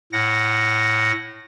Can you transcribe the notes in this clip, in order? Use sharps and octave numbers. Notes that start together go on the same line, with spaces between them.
A2 F#5 A#6